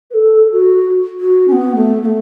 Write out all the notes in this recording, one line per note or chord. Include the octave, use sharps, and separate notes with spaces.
B4
A4
F#4
F#4
C#4
B3
A3
B3
A3